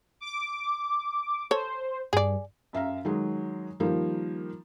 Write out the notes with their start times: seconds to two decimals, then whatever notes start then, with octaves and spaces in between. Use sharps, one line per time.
0.20 D6
1.51 A4 C5 C#5
2.13 G2 G#4 D5
2.73 F#2 E5 F5 A#5
3.05 D#3 F#3 G#3
3.80 D#3 F3 G3 A#3